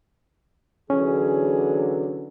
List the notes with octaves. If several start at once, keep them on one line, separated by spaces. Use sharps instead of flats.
D3 E3 F#3 C#4 G#4